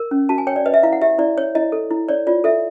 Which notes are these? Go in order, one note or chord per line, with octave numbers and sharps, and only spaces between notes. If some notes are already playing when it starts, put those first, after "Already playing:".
Already playing: A#4
C#4
F#4 A5
G#5
C#5 G5
D5
B4 D#5
E5
E4 F5
F#5
G4 E5
E4 D5
C#5
E4 D#5
A4
E4
C#5 D5
F4 D5
A4 E5